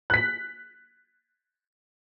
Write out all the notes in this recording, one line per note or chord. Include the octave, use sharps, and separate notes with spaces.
F#6 B6